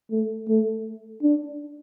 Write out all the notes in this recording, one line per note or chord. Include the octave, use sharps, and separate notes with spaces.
A3
A3
D4